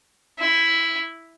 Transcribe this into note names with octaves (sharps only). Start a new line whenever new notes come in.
E4